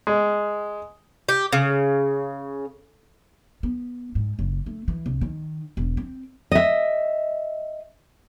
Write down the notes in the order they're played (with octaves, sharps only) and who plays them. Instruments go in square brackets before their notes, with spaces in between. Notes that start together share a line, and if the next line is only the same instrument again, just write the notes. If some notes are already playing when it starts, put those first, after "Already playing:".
[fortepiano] G#3
[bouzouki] G4
C#3
[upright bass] B3
G#2
F#1
A3
E3
C2
D#3
E1
C4
[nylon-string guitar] D#5 E5